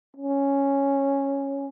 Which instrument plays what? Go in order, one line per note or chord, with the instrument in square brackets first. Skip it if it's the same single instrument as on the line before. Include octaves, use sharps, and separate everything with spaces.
[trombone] C#4